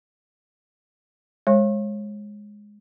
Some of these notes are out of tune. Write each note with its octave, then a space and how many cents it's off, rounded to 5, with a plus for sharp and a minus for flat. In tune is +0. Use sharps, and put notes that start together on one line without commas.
G#3 +0 C#5 -35 C#6 -45